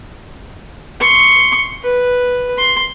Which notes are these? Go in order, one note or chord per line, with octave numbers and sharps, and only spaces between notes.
C6 C#6
B4
C6